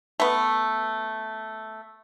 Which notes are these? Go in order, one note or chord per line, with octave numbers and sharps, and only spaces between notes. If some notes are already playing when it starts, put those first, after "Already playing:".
A3 B3